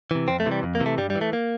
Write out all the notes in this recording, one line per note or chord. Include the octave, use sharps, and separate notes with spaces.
C3 E3
F2 C4
A3
C3 E3
G3
F2
A#3
C3 E3
A3
G2 G3
G3
E3
A3
A#3